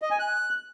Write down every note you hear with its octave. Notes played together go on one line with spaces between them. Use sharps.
D#5
G#5
F#6